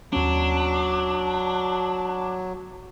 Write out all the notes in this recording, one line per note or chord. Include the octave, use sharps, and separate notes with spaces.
D#2 F#3 B3 C#4 D4